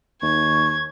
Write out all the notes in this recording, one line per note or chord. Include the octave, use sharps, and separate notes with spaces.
D#2 C#6 G#6